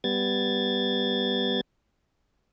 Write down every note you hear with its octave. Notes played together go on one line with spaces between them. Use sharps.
G3 B3 G#6 A6